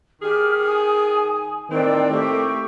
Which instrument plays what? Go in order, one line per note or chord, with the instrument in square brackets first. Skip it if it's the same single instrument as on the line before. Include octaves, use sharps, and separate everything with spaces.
[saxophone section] D#3 G#4 [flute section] G4 F6
[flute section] G#5 D#6
[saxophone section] A2 A#3 C4 [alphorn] D#3 [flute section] B4 D5 G5
[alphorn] A3 [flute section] G4 C#6